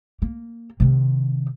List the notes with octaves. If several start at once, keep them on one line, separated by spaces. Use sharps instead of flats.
A#3
C3 D#3